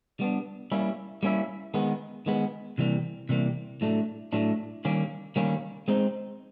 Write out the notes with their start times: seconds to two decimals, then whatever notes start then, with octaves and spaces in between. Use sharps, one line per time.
0.20 G3 B3 D4
0.72 G3 A#3 C#4 E4
1.23 G3 A#3 C#4 E4
1.74 D#3 G#3 B3
2.26 D#3 G#3 B3
2.78 C3 E3 G3 A#3
3.29 C3 E3 G3 A#3
3.81 A2 F#3 A3 D4
4.33 A2 F#3 A3 D4
4.85 D#3 G3 A#3 C#4
5.36 D#3 G3 A#3 C#4
5.88 G#3 C4 D#4